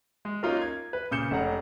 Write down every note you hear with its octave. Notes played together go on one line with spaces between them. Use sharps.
G#3
A#3 C#4 D#4 F4 A#4
G#6
B4
A#2 C#3 G6 C#7 E7
F1 C#4 F#5 A#5